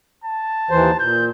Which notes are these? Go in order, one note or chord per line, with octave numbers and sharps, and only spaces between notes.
A5
D#2 E3 C5
A#2 G6